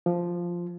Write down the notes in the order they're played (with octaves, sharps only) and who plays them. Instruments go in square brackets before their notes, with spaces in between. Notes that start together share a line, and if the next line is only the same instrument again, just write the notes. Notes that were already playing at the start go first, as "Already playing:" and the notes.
[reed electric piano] F3